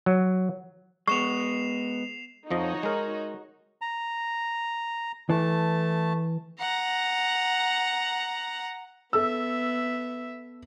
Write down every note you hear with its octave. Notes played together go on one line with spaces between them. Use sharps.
F#3
G#3 B3 C#6 C7 E7 F7
F2 F3 D#4 F#4 C#5 D#5
G#3 A#4
A#5
E3 A3 A5
F#5 A#5
B3 A4 E5 E6